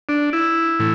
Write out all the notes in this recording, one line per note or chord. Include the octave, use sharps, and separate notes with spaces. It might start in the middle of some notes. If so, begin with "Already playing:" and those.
D4
E4
A2 E3